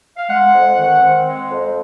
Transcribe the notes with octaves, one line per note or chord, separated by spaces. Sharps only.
F5
G#3 F#5
F2
D#3
C4
G#3
F2